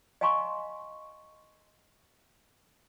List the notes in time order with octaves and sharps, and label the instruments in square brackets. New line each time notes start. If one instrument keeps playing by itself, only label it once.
[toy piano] D#5 F5 G#5 A#5 C6 C#6